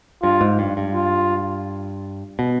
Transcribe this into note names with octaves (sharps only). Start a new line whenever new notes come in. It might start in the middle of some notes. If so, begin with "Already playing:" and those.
G2 F4
G#2
G2
G2
F4
B2